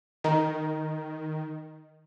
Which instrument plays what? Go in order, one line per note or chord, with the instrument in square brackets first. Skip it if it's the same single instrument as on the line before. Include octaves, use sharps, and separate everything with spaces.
[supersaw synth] D#3 [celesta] D#5 A#5